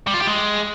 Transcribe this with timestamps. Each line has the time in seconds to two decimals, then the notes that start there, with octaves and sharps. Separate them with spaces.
0.07 G3
0.14 F4
0.20 G4
0.27 G#3